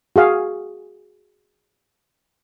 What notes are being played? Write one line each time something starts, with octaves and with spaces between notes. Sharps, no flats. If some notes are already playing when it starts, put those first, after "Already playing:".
F#4 G#4 F5